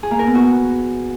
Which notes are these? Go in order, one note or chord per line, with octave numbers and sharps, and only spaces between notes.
G#4
A#3
A#4
B3
F#4